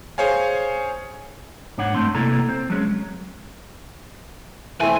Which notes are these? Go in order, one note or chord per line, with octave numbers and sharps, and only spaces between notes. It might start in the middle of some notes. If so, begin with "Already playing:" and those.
G#4 C5 C#5 F5 G#5
G#2 D4 C#5 F#5
G2 A3 C4 C6
C2 C3 A#3 E4 A4 A#5
C4
F#3 G#3 C#4
C2 E3 A3 C4 G#5